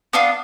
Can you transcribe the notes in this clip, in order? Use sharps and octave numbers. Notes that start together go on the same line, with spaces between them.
B3 D4 F4